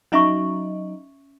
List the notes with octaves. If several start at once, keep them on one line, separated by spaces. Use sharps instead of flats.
F#3 C#4 D#4 E5 C#6